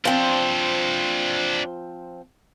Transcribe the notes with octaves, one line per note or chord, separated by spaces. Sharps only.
F3 C4 D4 C5